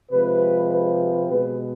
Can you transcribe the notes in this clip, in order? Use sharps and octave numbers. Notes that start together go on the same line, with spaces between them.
C3 F3 G#3 B4
B4
B2 G#3 B4